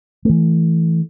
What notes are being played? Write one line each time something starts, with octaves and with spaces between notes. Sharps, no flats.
E3 A3